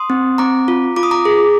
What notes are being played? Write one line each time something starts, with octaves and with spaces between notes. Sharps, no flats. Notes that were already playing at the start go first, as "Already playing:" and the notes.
Already playing: C6 D#6
C4
C4 A#5 D6
F4
F4 D6
D#6
A#5 D6
G#4